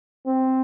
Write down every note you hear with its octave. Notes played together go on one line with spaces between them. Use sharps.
C4